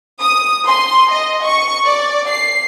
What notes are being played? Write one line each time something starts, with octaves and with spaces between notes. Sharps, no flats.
D#6
C6
D#5
C#6
D5
C7